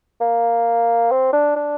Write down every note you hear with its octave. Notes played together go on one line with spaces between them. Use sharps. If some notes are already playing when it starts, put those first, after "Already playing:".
A#3
C4
D4
D4